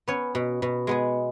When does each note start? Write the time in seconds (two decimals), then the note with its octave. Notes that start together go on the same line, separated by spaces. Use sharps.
0.08 B3 C#4 C#5
0.35 B2
0.62 B2
0.87 G#3 B3 G#4